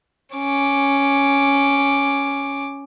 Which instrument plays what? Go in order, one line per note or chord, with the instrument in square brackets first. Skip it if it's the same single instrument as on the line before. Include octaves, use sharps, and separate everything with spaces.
[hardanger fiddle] C#4 D6